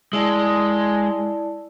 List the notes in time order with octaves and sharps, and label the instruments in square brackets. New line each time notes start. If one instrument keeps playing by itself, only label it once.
[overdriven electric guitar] G#3 [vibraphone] E4 D5 A5